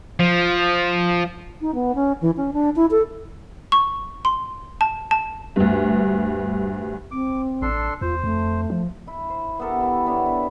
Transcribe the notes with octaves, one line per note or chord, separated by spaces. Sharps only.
F3
D#4
B3
C#4
E3
C#4
D4
E4
A4
C#6
C6
A5
A5
D2 G2
C4 D6
A1 D4 A4 C6
E2 F4 C5
F2 A3
F3
E4
C5
B3 G4 A4 A#4
E3 E4
B3 D4 C#5
E4